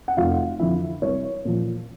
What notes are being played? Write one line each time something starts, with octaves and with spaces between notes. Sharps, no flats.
F#5
F1 F4 F5
F2 D3 F3 E4 E5
C2 C#5
A#2 F3